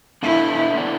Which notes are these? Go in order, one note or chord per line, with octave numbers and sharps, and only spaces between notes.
B2 B3 D4 E4 A4 E5
D3 B3 E4 D5